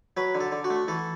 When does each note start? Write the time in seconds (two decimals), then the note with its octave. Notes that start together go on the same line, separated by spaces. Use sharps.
0.17 F#3 B4
0.35 D3
0.41 A4
0.52 D3
0.64 F#4
0.70 A3
0.88 E3 A4